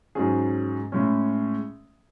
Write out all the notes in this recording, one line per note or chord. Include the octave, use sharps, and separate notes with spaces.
G#2 F#3 C#4 G#4
A2 G#3 C#4